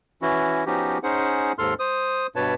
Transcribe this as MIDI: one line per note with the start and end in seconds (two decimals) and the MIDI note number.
0.22 0.64 52
0.22 0.64 61
0.22 0.64 64
0.22 0.64 66
0.66 0.98 53
0.66 0.98 59
0.66 0.98 61
0.66 0.98 63
0.66 0.98 66
0.66 0.98 67
1.03 1.52 61
1.03 1.52 63
1.03 1.52 68
1.03 1.52 72
1.03 1.52 78
1.58 1.74 39
1.58 1.74 44
1.58 1.74 69
1.58 1.74 84
1.58 1.74 89
1.79 2.27 72
1.79 2.27 87
2.36 2.55 43
2.36 2.55 47
2.36 2.55 71
2.36 2.55 73
2.36 2.55 81